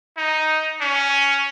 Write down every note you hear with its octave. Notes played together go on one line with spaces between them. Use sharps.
D#4
C#4